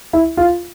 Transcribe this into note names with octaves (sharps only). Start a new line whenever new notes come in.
E4
F4